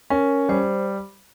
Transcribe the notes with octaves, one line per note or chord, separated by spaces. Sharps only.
C#4 A#4
G3 C5